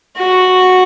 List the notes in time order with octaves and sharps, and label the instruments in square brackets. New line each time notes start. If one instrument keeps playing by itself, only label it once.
[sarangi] F#4